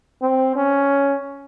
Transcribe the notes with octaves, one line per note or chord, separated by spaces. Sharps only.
C4
C#4